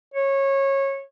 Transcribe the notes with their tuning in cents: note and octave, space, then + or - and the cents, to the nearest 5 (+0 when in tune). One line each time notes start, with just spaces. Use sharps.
C#5 -20